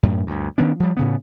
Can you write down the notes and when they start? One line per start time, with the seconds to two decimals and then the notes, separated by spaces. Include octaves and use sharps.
0.03 F#2 A2
0.27 D2 G2
0.58 D#3 B3 C#4 D4
0.80 F3 G3
0.97 A2 C#3 B3